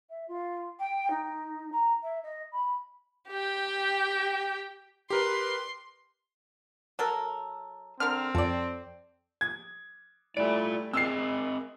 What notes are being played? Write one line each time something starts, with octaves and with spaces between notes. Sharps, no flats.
E5
F4
G5
D#4
A#5
E5
D#5
B5
G4 G5
G4 A#4 B4 C6
F#3 A4 A#4
D3 C4 A#4 F6
F2 A4 D5
G#6
G3 A3 E4 F4 D5 D7
C4 G#4 A#4 D#5 E6 C7